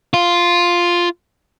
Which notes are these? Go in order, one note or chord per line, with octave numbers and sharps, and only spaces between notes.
F4